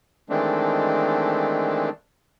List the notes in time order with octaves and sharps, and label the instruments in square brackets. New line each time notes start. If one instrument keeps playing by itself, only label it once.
[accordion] D#3 E3 G#3 A3 C4 D4